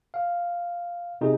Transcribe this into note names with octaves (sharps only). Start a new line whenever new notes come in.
F5
C3 D#4 G#4